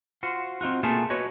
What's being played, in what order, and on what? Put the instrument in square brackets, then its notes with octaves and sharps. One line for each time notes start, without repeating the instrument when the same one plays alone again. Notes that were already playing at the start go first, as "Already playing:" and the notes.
[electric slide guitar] F4 F#4 C5
C4 D#4 F4 F#4
B2 A3 A#3 F4 G#4 A5
F#4 B4 C#5 D#5